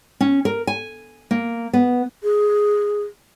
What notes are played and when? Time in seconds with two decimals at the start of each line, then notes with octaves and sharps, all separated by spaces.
0.21 C#4
0.45 A#4
0.67 G#5
1.31 A#3
1.73 B3
2.23 G#4